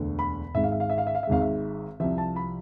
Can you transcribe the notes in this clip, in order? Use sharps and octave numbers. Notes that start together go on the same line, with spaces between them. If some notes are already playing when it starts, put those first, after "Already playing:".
Already playing: E1 D2 D3
B5
G#1 G#2 G#3 E5
F5
E5
F5
E5
F5
E5
F5
E5
G#1 G#2 G#3 F5
E5
C2 C3 F3 E5
A5
B5